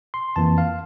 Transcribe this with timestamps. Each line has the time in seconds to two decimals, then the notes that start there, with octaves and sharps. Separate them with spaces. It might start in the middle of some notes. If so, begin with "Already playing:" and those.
0.14 C6
0.36 F2 E3 A#3 A5
0.58 F5